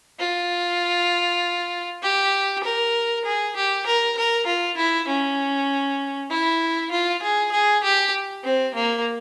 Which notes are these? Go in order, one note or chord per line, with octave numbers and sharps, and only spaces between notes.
F4
G4
A#4
G#4
G4
A#4
A#4
F4
E4
C#4
E4
F4
G#4
G#4
G4
C4
A#3